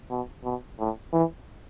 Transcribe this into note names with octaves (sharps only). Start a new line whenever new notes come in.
B2
B2
A2
E3